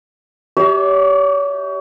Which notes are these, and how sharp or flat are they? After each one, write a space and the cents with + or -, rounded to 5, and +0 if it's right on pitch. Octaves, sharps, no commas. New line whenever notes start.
G4 -10 C#5 +35 E5 -30